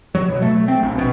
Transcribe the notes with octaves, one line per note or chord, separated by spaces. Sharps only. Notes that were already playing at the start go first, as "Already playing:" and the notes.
F#3
B2
A3
C4
A#1
B2